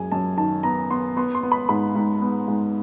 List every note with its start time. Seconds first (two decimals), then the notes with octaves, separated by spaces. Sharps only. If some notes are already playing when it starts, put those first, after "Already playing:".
Already playing: F#2 G#3 G#5
0.12 F#2 A5
0.37 D#3 A5
0.63 B3 A#5
0.90 B3 C6
1.17 B3 C6
1.35 C6
1.43 B3
1.52 B5
1.69 G#2 B5
1.95 G#2
2.22 B3
2.48 G#2